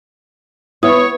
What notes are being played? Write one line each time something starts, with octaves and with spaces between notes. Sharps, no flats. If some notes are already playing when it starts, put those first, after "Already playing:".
B3 E4 C#5 D#6